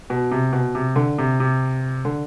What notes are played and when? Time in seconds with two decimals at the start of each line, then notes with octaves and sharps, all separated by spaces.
0.10 B2
0.31 C3
0.53 B2
0.75 C3
0.96 D3
1.18 C3
1.40 C3
2.05 D3